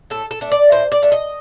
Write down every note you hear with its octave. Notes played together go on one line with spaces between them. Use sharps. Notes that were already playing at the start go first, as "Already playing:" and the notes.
A2 A4
A4
A3 D4
D5
A2 C5
D5
A3 D4
D#5